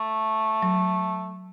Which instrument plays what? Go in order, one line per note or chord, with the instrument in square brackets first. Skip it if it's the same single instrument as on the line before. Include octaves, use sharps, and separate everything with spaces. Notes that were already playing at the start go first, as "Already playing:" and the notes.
Already playing: [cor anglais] A3
[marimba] F#3